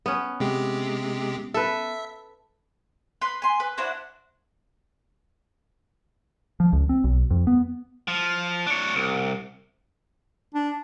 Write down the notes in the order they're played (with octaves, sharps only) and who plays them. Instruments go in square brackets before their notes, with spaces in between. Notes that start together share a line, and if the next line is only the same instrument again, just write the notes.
[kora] B3 C#4
[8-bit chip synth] C3 G#3 G4
[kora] A4 B4 [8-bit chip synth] E5
[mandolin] B4 C6
G#5 C6
B4
D4 E4 F#4 C5
[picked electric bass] F3
C#2
C4
B1
F2
B3
[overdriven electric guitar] F3
D4 C#5
C2
[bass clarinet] D4